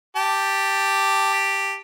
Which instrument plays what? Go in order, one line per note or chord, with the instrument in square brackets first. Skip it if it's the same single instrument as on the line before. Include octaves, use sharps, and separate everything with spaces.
[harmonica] G4 A5